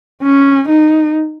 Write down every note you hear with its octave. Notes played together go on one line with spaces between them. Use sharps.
C#4
D#4